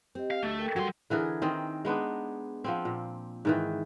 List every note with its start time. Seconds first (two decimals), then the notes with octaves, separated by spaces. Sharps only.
0.15 C4 G4 D#5
0.31 F5
0.43 D2 A3
0.58 A4 A#4 G5
0.76 F#3 G3 F#4 C6
1.10 D3 E3 G#4 A#4
1.42 D#3 C4 D#5
1.85 G#3 B3 D4 D#4
2.64 F3 B3 C4
2.85 A#2
3.45 G#2 D#3 E3